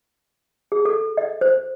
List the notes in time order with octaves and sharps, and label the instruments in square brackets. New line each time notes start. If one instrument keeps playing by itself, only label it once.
[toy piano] G#4
A4
D#5
C5